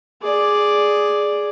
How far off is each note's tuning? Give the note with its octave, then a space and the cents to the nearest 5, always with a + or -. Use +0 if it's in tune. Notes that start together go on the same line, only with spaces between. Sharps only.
G#4 +0 D5 +0